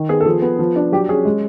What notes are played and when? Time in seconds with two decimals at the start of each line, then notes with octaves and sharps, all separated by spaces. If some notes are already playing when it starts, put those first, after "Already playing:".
Already playing: D#3
0.09 B3 G#4
0.20 A4
0.25 F3 G#4
0.42 B3
0.59 F3
0.76 D4
0.92 F#3 G4
1.09 C#4 G#4
1.25 G#3